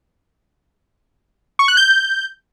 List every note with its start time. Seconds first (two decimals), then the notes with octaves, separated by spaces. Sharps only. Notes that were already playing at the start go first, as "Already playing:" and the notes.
1.59 C#6
1.68 F#6
1.77 G6